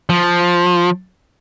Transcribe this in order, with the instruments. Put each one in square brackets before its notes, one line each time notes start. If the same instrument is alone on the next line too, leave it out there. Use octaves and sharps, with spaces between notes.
[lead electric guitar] F3